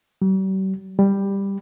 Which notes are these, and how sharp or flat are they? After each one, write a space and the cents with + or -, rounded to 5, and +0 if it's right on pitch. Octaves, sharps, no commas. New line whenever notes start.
G3 -45
G3 +10